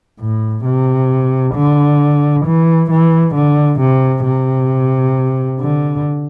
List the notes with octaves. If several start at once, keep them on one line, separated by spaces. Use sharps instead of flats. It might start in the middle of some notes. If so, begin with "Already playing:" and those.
A2
C3
D3
E3
E3
D3
C3
C3
D3